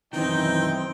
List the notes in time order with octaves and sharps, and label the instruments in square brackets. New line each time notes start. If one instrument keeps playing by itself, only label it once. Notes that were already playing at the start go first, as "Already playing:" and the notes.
[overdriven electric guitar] F#2 D#3 [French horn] E3 [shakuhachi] C4 [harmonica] D#4 G5